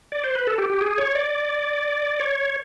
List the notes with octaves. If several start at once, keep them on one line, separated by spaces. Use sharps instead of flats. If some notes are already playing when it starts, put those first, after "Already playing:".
D5
C5
B4
A4
G4
G4
G#4
C#5
D5
C#5